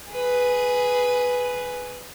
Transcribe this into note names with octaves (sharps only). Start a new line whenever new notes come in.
G#4 B4